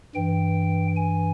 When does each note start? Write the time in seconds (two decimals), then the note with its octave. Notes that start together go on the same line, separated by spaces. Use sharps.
0.15 G2 E3 G5
0.96 G#5